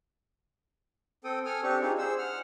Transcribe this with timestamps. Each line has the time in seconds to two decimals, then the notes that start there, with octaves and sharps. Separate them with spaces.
1.24 C4 A4 G5 D#6
1.45 A4 G#5 D#6 F6
1.63 C4 D4 G4 C#6
1.81 D#4 F4 G4 G#4
1.98 G#4 C5 E6
2.19 F#5 F6